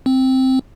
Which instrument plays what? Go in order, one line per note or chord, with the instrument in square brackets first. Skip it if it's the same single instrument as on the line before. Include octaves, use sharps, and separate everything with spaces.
[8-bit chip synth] C4